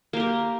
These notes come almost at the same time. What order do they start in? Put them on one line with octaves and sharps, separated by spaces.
A#3 G4 A#4